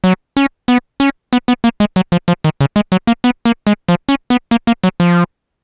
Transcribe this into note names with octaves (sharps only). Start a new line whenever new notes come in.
F#3
C#4
B3
C#4
B3
B3
A#3
G#3
F#3
F3
F3
D#3
C#3
G#3
F#3
A#3
B3
A#3
G#3
F3
C#4
B3
A#3
A#3
F#3
F3